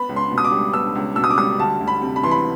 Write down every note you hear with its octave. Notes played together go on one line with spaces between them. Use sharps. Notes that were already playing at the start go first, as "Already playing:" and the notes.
Already playing: B3 B5
C#2
C6
B2
D#6
D6
G3
B3 E6
C#2
B2 E6
D#6
D6
G3 D#6
D2 A5
D2
B5
C3
B5
E3 C6
B5